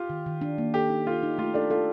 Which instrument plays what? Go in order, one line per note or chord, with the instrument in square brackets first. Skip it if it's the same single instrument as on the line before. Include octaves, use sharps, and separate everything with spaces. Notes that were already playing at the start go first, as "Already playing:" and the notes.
Already playing: [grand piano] F4 G4
[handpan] D#3
D#3
D4
A#3
[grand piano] G4 [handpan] A4
[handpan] D#4
[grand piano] F4 [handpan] A4
[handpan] D#4
[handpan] A3 [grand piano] F4
[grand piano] D4 [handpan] A4
[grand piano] F4 [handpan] A4